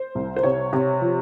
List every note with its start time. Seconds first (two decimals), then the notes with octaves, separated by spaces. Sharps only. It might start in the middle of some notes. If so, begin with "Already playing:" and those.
Already playing: C5
0.15 C2
0.36 C5
0.43 C3 C#5
0.73 C3
1.01 F3